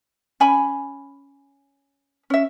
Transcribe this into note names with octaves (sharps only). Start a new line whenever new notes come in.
C#4 G#5 B5
C#4 E5